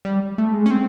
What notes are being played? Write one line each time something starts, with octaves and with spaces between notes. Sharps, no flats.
G3
A3
G#3
C#4
C4